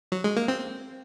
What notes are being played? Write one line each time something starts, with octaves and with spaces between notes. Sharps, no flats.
F#3
G#3
A#3
C4